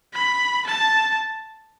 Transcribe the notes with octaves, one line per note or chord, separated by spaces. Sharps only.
B5
A5